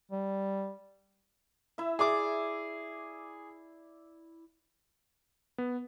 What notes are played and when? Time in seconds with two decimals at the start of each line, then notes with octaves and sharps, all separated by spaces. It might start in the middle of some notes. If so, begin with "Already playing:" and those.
0.12 G3
1.78 E4 E5
1.99 G#4 D5 D6
5.58 B3